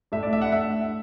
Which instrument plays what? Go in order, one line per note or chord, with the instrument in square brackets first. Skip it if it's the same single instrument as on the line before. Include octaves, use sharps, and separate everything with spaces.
[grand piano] A2 A3 D4 E5
D5
E5
F#5
A2 A3 D4 E5